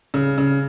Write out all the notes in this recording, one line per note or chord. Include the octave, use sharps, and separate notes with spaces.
C#3
C#3